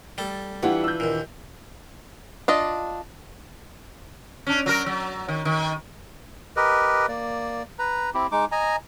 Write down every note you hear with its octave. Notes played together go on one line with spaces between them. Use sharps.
G3 A3 A4
E3 D4 E4 F4 G4 F#5
E6 G6
D#2 A#2
D4 F4 D#5
C#4 D4
F#3 F#4 A#4
F#3
D#3
D#3
G4 A#4 B4 D#5
A#3 D5
B4 A#5
C4 E4 G4
G#3 D#4 D6
D#5 G#5 A#5